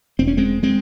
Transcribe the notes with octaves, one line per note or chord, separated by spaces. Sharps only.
E1 C4
C#4
G#3 C4
G#3 C4